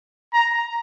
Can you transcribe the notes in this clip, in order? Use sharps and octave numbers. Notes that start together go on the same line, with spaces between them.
A#5